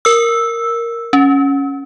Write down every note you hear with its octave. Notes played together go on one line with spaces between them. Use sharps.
A#4 E6
C#4